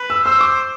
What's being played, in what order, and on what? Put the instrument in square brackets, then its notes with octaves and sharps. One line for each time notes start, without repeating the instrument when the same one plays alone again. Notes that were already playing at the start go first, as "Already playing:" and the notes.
Already playing: [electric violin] B4
[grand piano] E6
[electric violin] C5 [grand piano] E6
[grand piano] D6